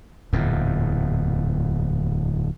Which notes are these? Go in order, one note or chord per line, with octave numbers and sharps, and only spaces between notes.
D1 E2 A#2